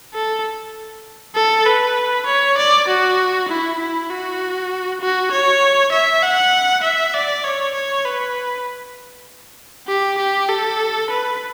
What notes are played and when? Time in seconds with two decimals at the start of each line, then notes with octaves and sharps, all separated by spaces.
0.14 A4
1.36 A4
1.66 B4
2.27 C#5
2.58 D5
2.88 F#4
3.49 E4
3.79 E4
4.10 F#4
5.01 F#4
5.31 C#5
5.92 E5
6.22 F#5
6.83 E5
7.14 D5
7.44 C#5
7.75 C#5
8.05 B4
9.88 G4
10.18 G4
10.49 A4
11.10 B4